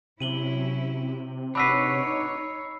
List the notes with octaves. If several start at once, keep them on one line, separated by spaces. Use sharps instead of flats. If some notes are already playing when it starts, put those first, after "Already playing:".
C3 F#3 C#4 E4 D#7 F#7 G7
D4 D#4 F#4 B4 C#5 B5 E6 C7